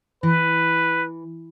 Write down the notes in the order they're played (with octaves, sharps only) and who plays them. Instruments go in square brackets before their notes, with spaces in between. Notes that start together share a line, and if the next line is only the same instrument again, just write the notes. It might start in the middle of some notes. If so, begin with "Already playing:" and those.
[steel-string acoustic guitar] E3 [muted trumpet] B4